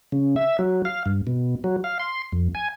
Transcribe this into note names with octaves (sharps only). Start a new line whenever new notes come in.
C#3
E5
F#3
F5
G2
B2
F#3
F5
C6
F2
G#5